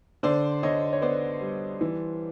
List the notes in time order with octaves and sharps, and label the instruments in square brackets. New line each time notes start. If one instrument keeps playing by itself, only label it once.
[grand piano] D3 C5 D5
D3 C#5 D#5
C#5
B3 C5 D5
G3
E3